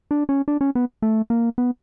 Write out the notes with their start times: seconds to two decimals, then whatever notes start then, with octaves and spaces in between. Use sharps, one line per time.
0.11 D4
0.29 C#4
0.48 D4
0.61 C#4
0.75 B3
1.02 A3
1.30 A#3
1.58 B3